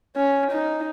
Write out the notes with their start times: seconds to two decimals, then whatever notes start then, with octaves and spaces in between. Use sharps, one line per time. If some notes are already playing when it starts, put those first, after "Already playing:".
0.16 C#4
0.52 D#4